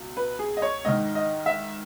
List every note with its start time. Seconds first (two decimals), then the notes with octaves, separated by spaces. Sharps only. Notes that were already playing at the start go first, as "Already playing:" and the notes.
Already playing: C#2 B2
0.17 B4
0.39 G#4
0.57 D#5
0.62 C#5
0.85 G#2 D#3 D#5
1.15 D#5
1.46 E5